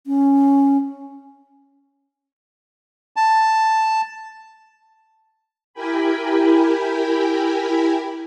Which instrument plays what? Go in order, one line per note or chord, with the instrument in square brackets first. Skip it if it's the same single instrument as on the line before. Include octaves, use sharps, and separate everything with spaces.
[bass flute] C#4
[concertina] A5
[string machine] E4 G4 A#4 G5 G#5 B5